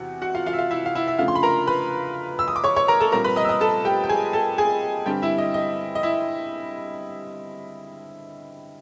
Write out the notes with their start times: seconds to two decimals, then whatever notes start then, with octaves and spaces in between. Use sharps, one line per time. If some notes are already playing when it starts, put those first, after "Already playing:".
Already playing: E2 C3 E3 F#4 F#5
0.22 F#4 F#5
0.35 F4 F5
0.46 F4 F5
0.53 E5
0.58 F4 F5
0.71 E4 E5
0.86 F5
0.95 E4 E5
1.08 E5
1.18 C#3 F3 A3 D4 F4 F5
1.28 C6
1.35 B5
1.43 A#4 A#5
1.67 B4 B5
2.39 E6
2.48 D#6
2.56 D6
2.64 C#5 C#6
2.76 C#5 C#6
2.88 A#4 A#5
3.00 A4 A5
3.12 A#2 G3 C4 A#4 A#5
3.24 B4 B5
3.36 D#5 D#6
3.45 E6
3.49 D#5 D#6
3.61 A4 A5
3.85 G4 G5
4.04 G5
4.09 G#4 G#5
4.33 A4 A5
4.58 G#4 G#5
5.06 G2 D3 G3 C4 G4 G5
5.22 E4 E5
5.38 D#5
5.54 D#5
5.95 D#5
6.03 E4 E5